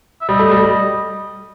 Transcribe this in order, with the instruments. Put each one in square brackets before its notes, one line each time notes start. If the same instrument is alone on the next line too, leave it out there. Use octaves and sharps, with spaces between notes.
[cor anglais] E5
[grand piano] G3 [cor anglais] D#5
[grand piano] A3
G3
G3